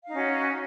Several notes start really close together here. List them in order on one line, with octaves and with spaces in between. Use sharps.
F5 D#4 C#4 F#4